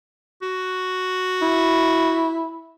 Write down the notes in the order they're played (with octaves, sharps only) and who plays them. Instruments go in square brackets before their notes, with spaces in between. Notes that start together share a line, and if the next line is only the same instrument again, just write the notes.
[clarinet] F#4
[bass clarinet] E4